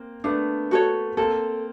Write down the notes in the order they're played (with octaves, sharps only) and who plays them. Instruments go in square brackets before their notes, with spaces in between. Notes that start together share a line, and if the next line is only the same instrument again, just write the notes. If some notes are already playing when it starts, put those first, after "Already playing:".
Already playing: [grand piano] A#3 C4
[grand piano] A3 B3 [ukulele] D4
[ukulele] F#4 A4 C#5
[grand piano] A#3 C4 [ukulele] A4